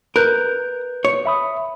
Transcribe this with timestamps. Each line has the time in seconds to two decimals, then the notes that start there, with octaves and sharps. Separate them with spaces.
0.16 A#4 B4 F#6 G6
1.05 C#5
1.26 E5 B5 D#6